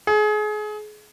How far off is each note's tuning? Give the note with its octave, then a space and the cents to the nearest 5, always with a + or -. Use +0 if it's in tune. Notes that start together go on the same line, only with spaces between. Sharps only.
G#4 +30